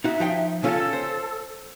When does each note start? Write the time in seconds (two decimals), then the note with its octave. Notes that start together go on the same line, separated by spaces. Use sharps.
0.04 D#4 F#4 E5
0.20 F3 D#4 G5
0.63 C#3 C#4 F4 A4
0.93 C5